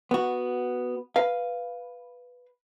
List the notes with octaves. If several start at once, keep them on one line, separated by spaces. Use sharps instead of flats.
B3 F#4
B4 F5